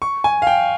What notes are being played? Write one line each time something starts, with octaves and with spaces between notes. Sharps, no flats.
C#6
G#5
F5
G5